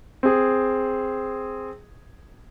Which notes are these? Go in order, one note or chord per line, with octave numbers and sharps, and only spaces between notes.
C4 G#4